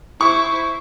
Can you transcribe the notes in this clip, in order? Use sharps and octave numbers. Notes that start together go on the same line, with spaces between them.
E4 C5 C#6